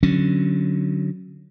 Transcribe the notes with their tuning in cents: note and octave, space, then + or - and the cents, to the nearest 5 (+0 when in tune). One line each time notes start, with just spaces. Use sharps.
D3 +0 F#3 +0 C#4 -15